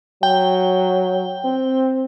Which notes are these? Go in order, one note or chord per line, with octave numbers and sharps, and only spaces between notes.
F#3 G5
C4